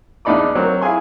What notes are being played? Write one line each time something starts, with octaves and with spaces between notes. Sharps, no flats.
E2 D4 D#4 D5 B5 D6
F#3 C4 A#4
E4 F4 G#4 G#5 C6